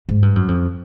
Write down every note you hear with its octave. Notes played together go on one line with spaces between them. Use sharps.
G#2
G2
F#2
F2